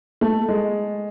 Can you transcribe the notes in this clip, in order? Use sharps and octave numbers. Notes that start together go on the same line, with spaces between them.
A3
G#3